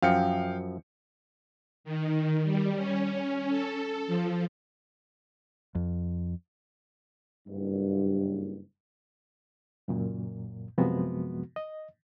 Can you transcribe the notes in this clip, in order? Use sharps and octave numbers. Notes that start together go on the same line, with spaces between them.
F#2 F3 F5 G5 C#7
D#3
G3
C#4
A4
F3
F2
F#1 G2
C#2 F#2 A#2
F#2 C3 F3 G#3 B3 F#4
D#5